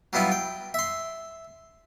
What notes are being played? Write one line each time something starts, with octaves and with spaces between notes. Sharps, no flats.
F#3 G3 B3 E4 F4
G5
E5 C6